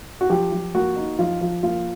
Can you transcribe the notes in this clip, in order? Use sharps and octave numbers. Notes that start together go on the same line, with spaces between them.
F#4
F3 G4
F3
A#3 F#4
D#4
F3 F4
F3
A#3 F4